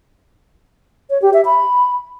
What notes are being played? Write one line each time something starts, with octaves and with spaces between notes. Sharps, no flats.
C#5
G4
E5
B5